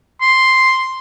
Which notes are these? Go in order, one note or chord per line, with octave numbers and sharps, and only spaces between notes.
C6